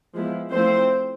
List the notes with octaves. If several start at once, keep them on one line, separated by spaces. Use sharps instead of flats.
F3 G#3 B3 E4
F3 A3 C4 E4 C5